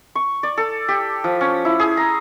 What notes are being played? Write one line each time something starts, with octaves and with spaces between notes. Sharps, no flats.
C#6
D5
A4
G4
F3
C#4
E4
G#4
A#5